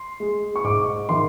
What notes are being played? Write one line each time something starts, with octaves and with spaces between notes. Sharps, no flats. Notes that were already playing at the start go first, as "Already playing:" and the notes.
Already playing: C6
G#3
C#6
G#2 D6
D#3 C6